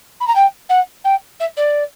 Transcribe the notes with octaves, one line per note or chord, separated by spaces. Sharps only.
B5
A#5
G5
F#5
G5
E5
D5